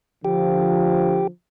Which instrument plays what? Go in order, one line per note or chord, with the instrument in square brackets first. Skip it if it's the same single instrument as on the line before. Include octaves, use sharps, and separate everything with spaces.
[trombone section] D3 F3 [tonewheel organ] G4